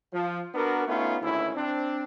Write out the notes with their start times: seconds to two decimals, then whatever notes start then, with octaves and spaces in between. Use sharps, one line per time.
0.13 F3
0.54 B3 D4 F#4 A#4
0.87 A3 B3 C#4 D#4 F4
1.21 G#1 D2 C#4 E4
1.54 C4 D4